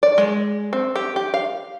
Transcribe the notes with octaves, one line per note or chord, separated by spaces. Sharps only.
D5
G#3
C4
G4
G4
F5